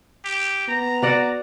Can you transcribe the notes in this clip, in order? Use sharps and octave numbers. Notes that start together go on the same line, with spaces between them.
G4
B3 A#5
F#4 D5 F#5